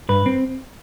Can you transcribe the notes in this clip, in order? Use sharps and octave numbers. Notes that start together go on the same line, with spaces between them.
G2 B4
C4